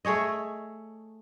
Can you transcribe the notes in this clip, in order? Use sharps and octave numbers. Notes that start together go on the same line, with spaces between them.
A3 G#4 C#5 D#5